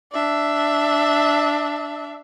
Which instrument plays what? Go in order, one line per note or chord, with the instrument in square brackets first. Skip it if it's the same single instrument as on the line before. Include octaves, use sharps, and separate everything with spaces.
[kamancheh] D4 E5